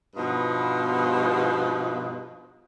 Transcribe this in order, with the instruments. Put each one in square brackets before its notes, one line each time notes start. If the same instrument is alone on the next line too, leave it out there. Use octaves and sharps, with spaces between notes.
[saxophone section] G2 B2 F3 B3 D#4 F4